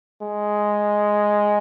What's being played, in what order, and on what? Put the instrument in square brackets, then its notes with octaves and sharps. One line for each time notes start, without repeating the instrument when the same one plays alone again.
[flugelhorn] G#3